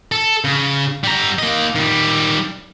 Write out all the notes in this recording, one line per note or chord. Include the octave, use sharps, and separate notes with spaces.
A4
C#3
G3 A#5
A#3 D#5
D#3 G3